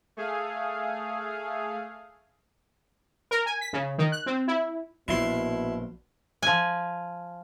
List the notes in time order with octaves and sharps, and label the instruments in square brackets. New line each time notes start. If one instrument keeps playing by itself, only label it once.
[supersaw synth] A3 G#4 F5
[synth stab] A#4
G#5
B6
C#3
D#3
F#6
C4
E4
[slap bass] A#1 [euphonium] B2 [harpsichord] E4 C6
[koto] F3 G#5